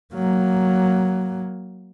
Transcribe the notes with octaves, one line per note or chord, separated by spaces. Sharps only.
F#3 A#3